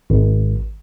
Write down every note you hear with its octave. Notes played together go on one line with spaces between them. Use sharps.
G#1